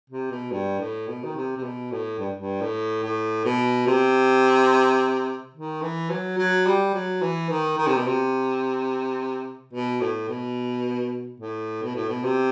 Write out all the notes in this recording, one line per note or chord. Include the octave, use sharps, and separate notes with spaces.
C3
B2
G2
A2
B2
D#3
C3
C3
B2
A2
G2
G2
A2
A2
B2
C3
D#3
E3
F#3
F#3
G3
F#3
E3
D#3
D#3
C3
B2
C3
B2
A2
B2
A2
B2
A2
B2
C3